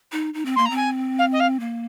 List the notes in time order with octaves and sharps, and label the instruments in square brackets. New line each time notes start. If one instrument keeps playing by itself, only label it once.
[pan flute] D#4
D#4
C4
[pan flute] A#3 [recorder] C6
[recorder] A#5
[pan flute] C4
[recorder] G#5
F5
D#5
F5
[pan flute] A#3